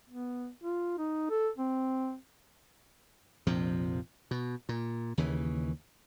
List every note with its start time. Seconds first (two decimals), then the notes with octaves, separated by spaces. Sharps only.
0.09 B3
0.63 F4
0.98 D#4
1.30 A4
1.58 C4
3.47 A#1 F2 C3 F3
4.31 B2
4.69 A#2
5.18 D#2 C#3 E3